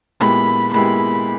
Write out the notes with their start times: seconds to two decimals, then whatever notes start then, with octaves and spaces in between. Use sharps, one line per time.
0.20 A#2 G#3 B3 E4 G4 B5
0.73 A#2 G#3 B3 E4 G4 B5